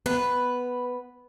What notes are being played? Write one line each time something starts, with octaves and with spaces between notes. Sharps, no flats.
B3 B4